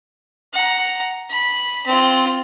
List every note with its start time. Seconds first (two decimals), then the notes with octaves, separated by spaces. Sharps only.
0.53 F#5 A#5
1.30 B5
1.86 C4 F4